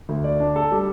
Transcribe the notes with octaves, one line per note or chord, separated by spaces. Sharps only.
D2
D5
D4
A4
G3